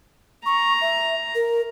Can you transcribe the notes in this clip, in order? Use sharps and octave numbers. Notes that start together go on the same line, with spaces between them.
A#5 C#6
E5
A#4